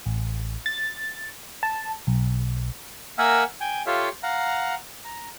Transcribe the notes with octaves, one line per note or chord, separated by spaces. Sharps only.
A1
A6
A5
B1
A#3 A#4 E5 F#5 G#5 E6
G5 G#5
F4 G4 A4 C#5 E5 F5
F5 F#5 A#5
A#5